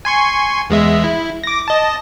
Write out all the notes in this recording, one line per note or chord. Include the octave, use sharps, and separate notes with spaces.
G#5 C6 C#6
E2 G#3 E5
E4
D6 A#6
D#5 A5